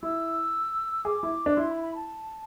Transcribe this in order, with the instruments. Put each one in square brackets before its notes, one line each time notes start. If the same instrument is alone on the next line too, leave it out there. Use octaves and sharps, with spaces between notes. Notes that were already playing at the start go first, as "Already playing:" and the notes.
[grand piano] E4 [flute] E6
[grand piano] G#4 [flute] D6
[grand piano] E4
D4
[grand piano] E4 [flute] C6
[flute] B5
B5
A5